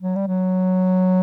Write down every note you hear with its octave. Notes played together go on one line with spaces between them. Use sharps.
F#3
G3
F#3